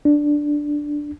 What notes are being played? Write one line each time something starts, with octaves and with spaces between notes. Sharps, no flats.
D4